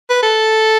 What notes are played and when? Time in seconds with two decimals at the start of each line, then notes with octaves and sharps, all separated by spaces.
0.10 B4
0.23 A4